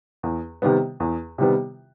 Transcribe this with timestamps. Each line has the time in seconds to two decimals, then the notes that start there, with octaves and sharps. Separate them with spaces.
0.23 E2
0.62 C3 D#3 G3 B3
1.00 E2
1.38 C3 D#3 G3 B3